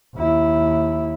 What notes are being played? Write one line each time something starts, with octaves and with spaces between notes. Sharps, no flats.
D#2 E4